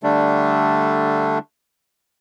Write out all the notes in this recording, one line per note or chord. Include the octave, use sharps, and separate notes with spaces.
D3 G3 A3 D4